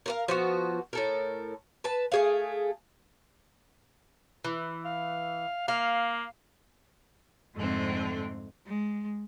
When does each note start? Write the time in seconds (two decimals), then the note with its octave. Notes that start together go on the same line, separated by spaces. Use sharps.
0.06 A#4 B4 F5
0.28 F3 B3 F#4
0.93 A2 A4 A#4
1.84 B4 A5
2.12 A3 G#4 F5
4.44 E3
4.85 F5
5.68 A#3 F5
7.54 F2 G#2 D3 A3 C4
8.66 G#3